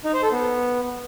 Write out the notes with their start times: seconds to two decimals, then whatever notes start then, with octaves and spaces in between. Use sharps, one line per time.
0.05 D#4
0.14 C5
0.23 A4
0.32 B3